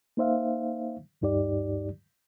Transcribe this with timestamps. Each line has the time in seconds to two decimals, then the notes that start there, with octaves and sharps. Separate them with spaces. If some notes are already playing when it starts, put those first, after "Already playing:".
0.17 A#3 D#4 C5 E5 F5
1.21 D2 G2 D#4 G4 D5